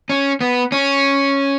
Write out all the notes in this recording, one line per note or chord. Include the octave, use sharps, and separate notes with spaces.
C#4
B3
C#4